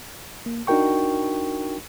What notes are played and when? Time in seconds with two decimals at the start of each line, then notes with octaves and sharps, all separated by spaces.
0.46 A#3
0.67 D4 D#4 F#4 A#4 G5 C#6